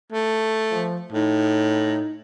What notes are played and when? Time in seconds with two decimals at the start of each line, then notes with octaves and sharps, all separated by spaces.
0.12 A3
0.70 F3
1.12 A2 D#4